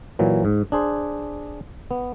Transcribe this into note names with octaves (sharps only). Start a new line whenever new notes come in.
A#2 E3 F#3
G#2
D4 G#4 C5
B3